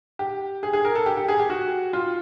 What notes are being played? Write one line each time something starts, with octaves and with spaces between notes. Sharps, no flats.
G4
G#4
G#4
A#4
A4
G4
G4
G#4
G4
F#4
F4